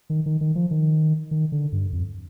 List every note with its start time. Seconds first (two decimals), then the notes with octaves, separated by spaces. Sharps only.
0.10 D#3
0.26 D#3
0.41 D#3
0.55 F3
0.71 D#3
1.31 D#3
1.52 D3
1.72 G2
1.92 F2